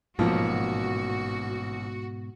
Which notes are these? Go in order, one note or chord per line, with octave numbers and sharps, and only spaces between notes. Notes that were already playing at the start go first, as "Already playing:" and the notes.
A1 G#2 B2 F3 A#3 F#4